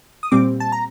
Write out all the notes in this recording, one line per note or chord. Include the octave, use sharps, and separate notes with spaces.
D#6
A#2 G3 C4 D6
A5
A#5